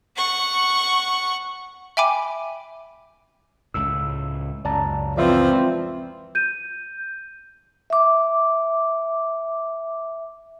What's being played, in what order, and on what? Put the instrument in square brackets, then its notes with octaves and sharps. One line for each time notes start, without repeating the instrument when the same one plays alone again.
[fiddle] F#5 C#6
[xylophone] E5 G5 G#5 B5 D6 D#7
[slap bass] C#2 A2 [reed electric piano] E6
[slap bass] C#2 F#2 [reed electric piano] D5 A5 A#5
[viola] E3 C4 [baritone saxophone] F3 [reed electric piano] D5 E5 C6
[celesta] G6 D#7
[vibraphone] E5 D6